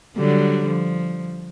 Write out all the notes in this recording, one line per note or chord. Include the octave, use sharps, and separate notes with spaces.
D3 F#3 G3
F3